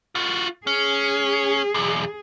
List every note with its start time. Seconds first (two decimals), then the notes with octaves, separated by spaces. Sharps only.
0.15 F4 F#4
0.67 C#4 G#4
1.74 B1 E2